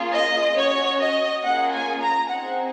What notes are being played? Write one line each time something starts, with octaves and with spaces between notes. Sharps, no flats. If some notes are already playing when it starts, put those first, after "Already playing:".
Already playing: A#3 C#4 F4 G#4
D#5
C#4 F#4 C#5
D#5
A#3 C#4 F4 G#4 F#5
G#5
A#5
C4 D#4 G#4 F#5